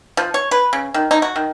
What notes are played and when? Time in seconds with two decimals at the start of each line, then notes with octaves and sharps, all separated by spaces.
0.17 F3
0.34 C#5
0.51 B4
0.73 C#3
0.94 D#3
1.11 D#4
1.22 F#4
1.36 D#3